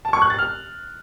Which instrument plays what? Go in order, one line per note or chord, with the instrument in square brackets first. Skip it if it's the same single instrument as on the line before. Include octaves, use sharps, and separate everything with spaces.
[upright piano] A5
C#6
F#6
A6
F6